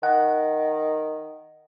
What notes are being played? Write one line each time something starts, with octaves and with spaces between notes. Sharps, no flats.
D#3 F#5